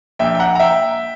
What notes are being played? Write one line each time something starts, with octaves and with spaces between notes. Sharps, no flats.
A#1 A#2 E5 G5
G5
F#5 A#5
A#5
E5 G5